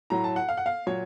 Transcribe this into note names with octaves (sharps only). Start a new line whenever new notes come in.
A2 F#3 A#5
A5
F#5
F5
F#5
F5
A#2 F#3 C#5